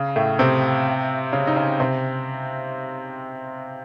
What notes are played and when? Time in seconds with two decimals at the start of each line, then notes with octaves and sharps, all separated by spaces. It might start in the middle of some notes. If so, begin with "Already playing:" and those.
Already playing: C#3
0.16 A2 A3
0.39 C3 C4
1.32 C#3 C#4
1.47 D#4
1.56 C#3 C#4
1.80 C3 C4